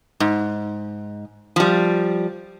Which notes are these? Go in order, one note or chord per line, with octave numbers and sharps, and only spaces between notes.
G#2
F3 G3